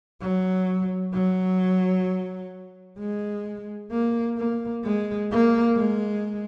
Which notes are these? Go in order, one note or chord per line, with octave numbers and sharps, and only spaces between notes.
F#3
F#3
G#3
A#3
A#3
G#3
A#3
G#3